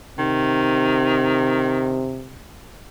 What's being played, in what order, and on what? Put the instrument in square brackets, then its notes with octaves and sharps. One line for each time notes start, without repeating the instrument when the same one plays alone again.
[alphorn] C3 [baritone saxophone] D#3